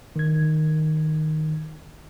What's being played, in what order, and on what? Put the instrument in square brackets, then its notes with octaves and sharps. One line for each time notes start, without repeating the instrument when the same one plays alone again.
[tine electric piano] D#3 G#6